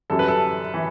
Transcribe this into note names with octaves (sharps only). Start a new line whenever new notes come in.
F#2 E3 G3 A4
B4
A4
E3